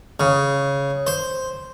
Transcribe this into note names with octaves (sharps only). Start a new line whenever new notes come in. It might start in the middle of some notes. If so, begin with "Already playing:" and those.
C#3
C5